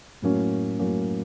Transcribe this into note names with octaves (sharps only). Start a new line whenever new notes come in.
A2 F#3 A#3 C#4
A2 F#3 A#3 C#4